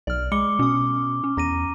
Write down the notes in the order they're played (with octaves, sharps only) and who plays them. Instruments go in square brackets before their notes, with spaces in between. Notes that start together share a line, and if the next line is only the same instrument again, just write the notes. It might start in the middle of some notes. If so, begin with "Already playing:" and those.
[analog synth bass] B1 [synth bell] D5 F6
[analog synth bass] G#3 [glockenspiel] B5 D6 G7 [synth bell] C#7
[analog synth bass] B2 [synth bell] C#4 D#6
[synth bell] C#4
[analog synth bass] E2 [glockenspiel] A#5 A#6 D#7